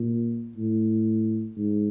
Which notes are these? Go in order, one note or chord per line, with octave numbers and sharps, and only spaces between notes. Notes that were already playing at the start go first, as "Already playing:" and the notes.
Already playing: A#2
A2
G#2